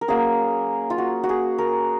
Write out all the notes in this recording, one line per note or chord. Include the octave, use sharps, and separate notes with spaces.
A#4
F#3 A#3 C#4 G#4
F4
F#4
F#4
G#4
A#4